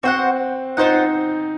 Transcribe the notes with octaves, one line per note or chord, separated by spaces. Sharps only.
C4 F#4 C5 F#5
D#4 F4 C5 F#5